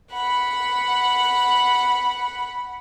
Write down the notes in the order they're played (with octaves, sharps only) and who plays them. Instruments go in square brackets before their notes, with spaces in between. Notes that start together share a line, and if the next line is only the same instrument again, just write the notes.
[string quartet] F#5 B5